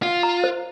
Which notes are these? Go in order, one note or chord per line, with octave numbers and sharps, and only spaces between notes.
F4 F#5
A#5
C5